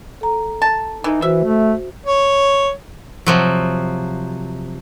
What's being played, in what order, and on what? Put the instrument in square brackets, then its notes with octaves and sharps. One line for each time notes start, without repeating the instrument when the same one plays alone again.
[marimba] A4 A#5
[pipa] A5
[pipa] E3 [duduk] D#4
[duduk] E3 [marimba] F#4 C5 [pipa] E5
[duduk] A3
[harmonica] C#5
[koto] C3 F3 F#3